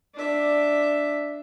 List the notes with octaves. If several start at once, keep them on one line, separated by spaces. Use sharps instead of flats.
D4 E5